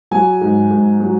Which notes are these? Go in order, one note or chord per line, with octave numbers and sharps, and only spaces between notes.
F#3 G#5
G#2
G#2
F#3